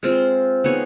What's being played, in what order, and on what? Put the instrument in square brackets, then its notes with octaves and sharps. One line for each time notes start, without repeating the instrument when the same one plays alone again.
[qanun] G#3 C4 F4
B3 D#4 G#4 C#5